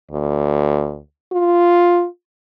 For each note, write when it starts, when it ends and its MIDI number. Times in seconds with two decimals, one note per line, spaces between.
0.11 1.01 38
1.32 2.06 65